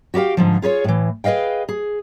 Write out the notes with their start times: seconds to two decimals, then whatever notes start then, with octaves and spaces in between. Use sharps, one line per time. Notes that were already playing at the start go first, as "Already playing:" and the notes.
0.14 F#4 G4 A#4 F5 G5
0.37 G#2 D3 F3
0.62 F4 G#4 B4 C#5
0.84 A2 E3
1.24 G#4 B4 D#5 F5 G5
1.69 G#4